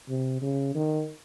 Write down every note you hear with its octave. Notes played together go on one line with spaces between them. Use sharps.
C3
C#3
D#3